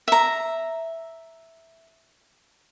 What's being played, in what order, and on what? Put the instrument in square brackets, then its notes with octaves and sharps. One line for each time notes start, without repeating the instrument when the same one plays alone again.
[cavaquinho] E5 A#5